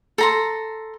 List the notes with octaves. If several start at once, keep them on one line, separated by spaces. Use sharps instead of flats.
A4 A#5 C6